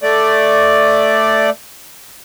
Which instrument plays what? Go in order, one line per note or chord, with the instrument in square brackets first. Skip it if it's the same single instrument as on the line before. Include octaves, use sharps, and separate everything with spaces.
[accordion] A3 D5